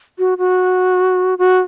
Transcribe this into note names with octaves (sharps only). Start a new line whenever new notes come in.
F#4
F#4
F#4